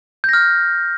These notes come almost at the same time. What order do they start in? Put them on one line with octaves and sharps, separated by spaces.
G6 A#6 F6